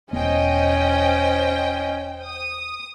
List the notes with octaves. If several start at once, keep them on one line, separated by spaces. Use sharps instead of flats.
E1 B3 C#4 C5 D#5 G5
D#6